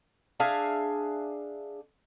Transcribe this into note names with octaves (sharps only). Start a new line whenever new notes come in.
D4 G#4 E5 F5